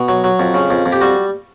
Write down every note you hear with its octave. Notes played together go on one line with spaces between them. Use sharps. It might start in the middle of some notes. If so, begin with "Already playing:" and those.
Already playing: B2
F#3
F#3
F2
C#3
F2
F2
G4
G3 F#4